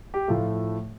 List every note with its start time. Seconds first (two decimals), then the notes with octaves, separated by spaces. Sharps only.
0.14 G4
0.28 A2 F3 A3 F4